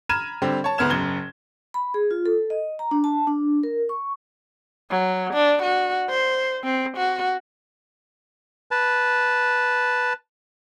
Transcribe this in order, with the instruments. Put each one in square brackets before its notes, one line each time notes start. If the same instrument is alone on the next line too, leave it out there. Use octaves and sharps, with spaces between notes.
[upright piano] A#5 B5 F6 G#6 D#7 E7
D3 G3 C4
C#5 A5
D2 G#2 B3 F6 G#6 E7
F#1 F#2 G#6 G7
[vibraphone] B5
G#4
F4
A4
D#5
A#5
D4
A5
D4
A#4
C#6
[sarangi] F#3
D4
F#4
C5
C4
F#4
[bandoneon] B4 A5